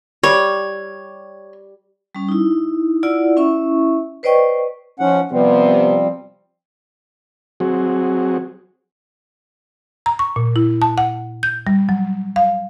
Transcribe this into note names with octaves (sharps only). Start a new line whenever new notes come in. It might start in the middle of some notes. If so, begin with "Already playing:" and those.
G3 C#5
G3 C#4
D#4 E4
E4 F4 D5 F#5 E6
C#4 E4 E5 C#6
B4 C5 D5 D#5 G5 C#6
F3 C#4 D#4 F#5
C3 F3 G3 B3 C4
F#3 C4 F#4 G#4
A#5
C#6
A#2
E4
A5
F#5
G6
G3
F#3
F5